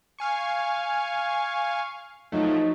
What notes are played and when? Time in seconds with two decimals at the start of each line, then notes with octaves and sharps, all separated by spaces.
0.19 F5 G#5 C#6
2.32 F3 F#3 A3 D#4